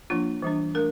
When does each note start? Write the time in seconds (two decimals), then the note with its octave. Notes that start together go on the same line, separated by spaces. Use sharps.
0.10 F3 A#3 D4 F4
0.42 E3 G3 D4
0.75 A3 D4 A#4